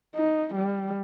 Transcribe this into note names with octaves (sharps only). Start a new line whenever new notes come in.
D#4
G3